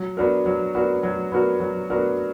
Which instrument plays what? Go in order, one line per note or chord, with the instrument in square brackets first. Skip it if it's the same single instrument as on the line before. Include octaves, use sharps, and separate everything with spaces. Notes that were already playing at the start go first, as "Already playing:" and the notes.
Already playing: [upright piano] F#3
B3 D4 F#4 A#4
F#3
B3 D4 F#4 A#4
F#3
B3 D4 F#4 A#4
F#3
B3 D4 F#4 A#4